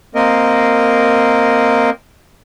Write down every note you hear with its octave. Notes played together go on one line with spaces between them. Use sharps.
A#3 C4 A#4 D#5